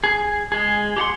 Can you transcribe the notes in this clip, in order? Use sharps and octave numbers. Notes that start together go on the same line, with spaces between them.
G#4
G#3 G#4
G4 G#4 F#5 C6